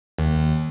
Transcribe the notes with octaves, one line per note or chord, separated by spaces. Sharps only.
D#2